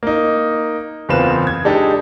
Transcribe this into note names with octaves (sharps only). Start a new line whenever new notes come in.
A#3 D#4
F#1 E2 C4 F4 B4 E7
G#6
G#3 D4 D#4 G4 A4